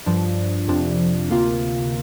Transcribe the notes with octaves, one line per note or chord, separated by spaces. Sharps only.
G2 F3 D4
F2 C3 F3 D4
D2 C3 A#3 F4